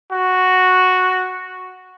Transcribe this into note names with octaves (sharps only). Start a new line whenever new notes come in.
F#4